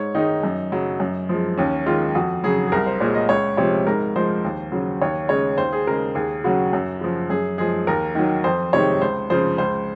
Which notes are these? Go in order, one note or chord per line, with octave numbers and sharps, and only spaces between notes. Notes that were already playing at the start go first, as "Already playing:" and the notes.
Already playing: G#2 C#5
D#3 G#3 D#4
F#2
C#3 F#3
F#2
F3 G#3
D#2 C#4
D#3 G#3 F4
F2 F#4
C#3 F#3 G#4
G#4
C2 A#4
C5
A#2 G#3 C#5
D#5
C#2 C#5
C3 F3 G#3 C#5
G#2 A#4
F3 G#3 C5
D#2
C#3 F#3
D#2 C#5
C#3 G#3 C#5
D#2 C5
G#4
C#3 G#3 A#4
D#2 G#4
C#3 F#3 F#4
F#2
C#3 F3
F#2 G#4
F3 G#3 G#4
D#2 A#4
D#3 F#3
F2 C5
C3 D#3 G#3 C#5
C#2 C5
C#3 F3 C5
C#2 C5